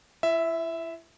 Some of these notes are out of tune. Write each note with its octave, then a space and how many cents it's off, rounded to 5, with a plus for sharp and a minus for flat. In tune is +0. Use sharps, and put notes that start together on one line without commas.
E4 +35 E5 -5